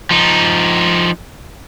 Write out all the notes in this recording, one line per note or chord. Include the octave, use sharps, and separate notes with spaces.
F3 D#4